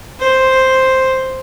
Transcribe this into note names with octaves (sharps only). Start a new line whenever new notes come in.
C5